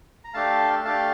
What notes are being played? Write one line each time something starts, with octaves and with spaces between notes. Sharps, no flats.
A#5
A3 D4 G4 F5 A5
A3 D4 G4 F5 A5